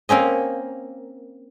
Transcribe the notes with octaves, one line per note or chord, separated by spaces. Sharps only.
A#3 C4 C#4 D#5